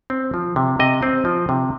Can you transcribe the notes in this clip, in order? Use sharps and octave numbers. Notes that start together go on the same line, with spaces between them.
C4
F3
C3
C3 D#5
C4
F3
C3